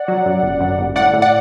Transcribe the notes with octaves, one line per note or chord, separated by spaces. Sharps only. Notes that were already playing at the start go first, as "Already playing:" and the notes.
Already playing: D5 F#5
F#3
F#2
G1
F#2
G1
A2 D5 F#5
A2
D5 F#5